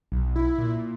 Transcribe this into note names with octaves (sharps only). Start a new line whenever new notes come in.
B1
E4
A#2